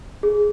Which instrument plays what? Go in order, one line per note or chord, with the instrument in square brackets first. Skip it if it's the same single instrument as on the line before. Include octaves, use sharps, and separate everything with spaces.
[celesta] G#4